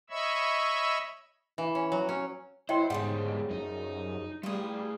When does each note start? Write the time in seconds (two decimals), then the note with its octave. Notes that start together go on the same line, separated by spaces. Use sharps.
0.10 C#5 D#5 E5 B5 C#6 E6
1.58 E3
1.75 C#4
1.92 F#3
2.09 C#4
2.69 F#3 E4 C5 D#5 G5 C6
2.90 E2 G#2 C#3 F3 G3 G4 F#5
3.50 F#2 D#4 D#5
4.43 G3 A3 F4 G#4 B4